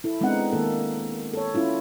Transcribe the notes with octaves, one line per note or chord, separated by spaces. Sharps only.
E4 A4
G#3 B3 C4 D4 D#4 F#5
D#3 A#3 A4
A4 C#5
C#4 E4 F4